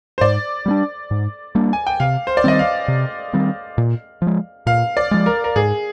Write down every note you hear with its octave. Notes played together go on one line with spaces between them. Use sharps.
C5
G#2 D5
G3 A#3
D4
G#2
G3 A#3 D4
G#5
G5
C3 F5
C5
D5
D#3 G3 C4 D#5
F5
C3
D#3 G3 C4
A#2
F3 G#3
A#2 F5
D5
F3 G#3
A#4
A#4
G#2 G#4